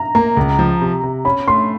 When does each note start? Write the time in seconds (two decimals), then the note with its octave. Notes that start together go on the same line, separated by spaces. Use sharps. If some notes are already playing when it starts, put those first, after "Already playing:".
Already playing: A#5
0.15 A#3 A#5
0.37 C#2
0.59 F3
0.81 C3
1.03 C3
1.25 C#4 B5
1.48 A3 C6